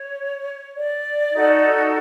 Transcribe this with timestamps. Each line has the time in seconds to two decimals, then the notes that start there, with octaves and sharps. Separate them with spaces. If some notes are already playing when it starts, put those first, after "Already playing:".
Already playing: C#5
0.77 D5
1.32 D#4 F#4 A4